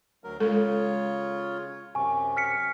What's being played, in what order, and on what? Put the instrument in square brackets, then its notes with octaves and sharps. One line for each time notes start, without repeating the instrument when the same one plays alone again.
[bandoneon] D2 F#3 A#4
[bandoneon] C#3 F4 C#5 [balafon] G#3 A4
[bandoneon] F#2 C3 [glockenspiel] G#5 C#6
[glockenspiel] F6 B6 C#7